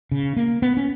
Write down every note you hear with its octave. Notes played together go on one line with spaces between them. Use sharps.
C#3
A#3
B3
C#4